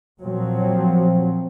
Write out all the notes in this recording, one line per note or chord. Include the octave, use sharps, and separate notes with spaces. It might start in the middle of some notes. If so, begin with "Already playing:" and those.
A#2 F3 F#3 C4